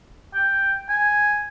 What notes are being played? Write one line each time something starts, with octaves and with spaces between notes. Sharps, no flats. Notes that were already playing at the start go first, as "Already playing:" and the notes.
G5
G#5